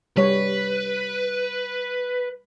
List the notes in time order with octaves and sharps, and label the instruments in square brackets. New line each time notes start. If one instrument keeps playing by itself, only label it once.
[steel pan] G3 C#5 [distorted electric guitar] B4